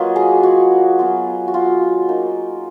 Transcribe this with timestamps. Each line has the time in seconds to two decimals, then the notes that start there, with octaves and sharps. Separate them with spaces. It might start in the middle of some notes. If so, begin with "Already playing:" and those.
Already playing: F#3 A#3 F4 B4 C#5 D#5
0.16 G#4
0.43 F#4
0.99 F#3 B3 F4
1.48 F#4
1.54 F4
2.09 A#3 D#4